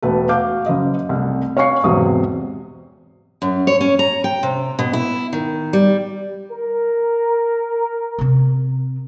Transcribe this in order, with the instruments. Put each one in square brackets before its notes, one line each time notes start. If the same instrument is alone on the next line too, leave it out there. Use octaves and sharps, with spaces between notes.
[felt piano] E1 A3 B4
F#4 F5 D6 G6
F#1 D#5
C2 A3
C#5 F5 G#5 C#6 C7
B1 E2 G#2 C3 D#6
[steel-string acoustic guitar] F#2
C#5
C#4
A#5
G5
C3
B2
E4
D#3
G3
[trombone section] A#4
[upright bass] C3 C4